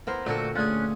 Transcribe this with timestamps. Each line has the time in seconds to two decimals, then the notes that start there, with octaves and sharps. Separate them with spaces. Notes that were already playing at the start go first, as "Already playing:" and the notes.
0.07 B3 E4 A#4 C5
0.26 A#2 D3 A3 C4 D4 F#4 A4
0.55 D2 D3 C#4 F4 G#4 F#6